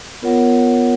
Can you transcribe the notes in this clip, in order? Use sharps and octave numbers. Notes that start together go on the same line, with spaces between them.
B3 F4 A#4 C#5 F#5